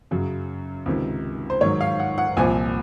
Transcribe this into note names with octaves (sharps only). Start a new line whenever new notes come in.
F#2 C#3 F#3
C#2 C3 D#3
C5
G#2 D#3 F#3 C#5
F5
F#5
F#5
C2 A#2 F3 G#5